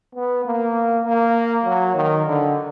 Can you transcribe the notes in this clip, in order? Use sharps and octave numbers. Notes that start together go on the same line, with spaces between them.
B3
A#3
A#3
F#3
D#3
D3